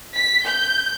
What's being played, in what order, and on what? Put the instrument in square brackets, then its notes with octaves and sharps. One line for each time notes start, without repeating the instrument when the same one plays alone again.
[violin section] B6
G6